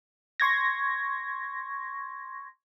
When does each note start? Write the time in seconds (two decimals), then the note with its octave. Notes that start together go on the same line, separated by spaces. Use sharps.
0.40 C6 C#6 G#6 A#6